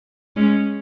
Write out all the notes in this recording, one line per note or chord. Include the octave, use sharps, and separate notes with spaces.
G#3 C#4